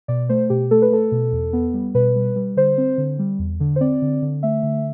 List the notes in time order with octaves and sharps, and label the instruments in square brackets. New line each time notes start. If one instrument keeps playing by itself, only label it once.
[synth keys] B2 D5
A3 C5
B2 G4
A3 A4
B4
A3 A4
B2
E2
B3
G3
B2 B4
G3
G3
D3 C5
C4
D3
G3
E2
D3
C5
C4 D5
D3
D3
A3 E5
D3